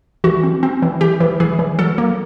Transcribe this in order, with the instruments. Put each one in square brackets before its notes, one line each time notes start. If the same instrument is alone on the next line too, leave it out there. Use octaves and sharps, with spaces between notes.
[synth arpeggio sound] E3 F#4
C4
C4
E3
E3 G4
E3
E3 G#4
E3
F#3 A4
A#3